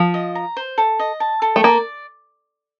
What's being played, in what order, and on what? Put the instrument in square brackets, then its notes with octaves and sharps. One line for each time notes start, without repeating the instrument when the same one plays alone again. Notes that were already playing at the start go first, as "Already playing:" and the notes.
Already playing: [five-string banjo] F3
[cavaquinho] D#5
A#5
C5
A4
D#5
A5
A4
[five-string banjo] A3
[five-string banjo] A#3 [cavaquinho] D5